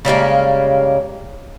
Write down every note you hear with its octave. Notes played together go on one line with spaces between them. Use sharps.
C#3 G3 G#3 A#3